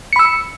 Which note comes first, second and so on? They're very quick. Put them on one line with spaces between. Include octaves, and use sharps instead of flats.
C#7 B5 E6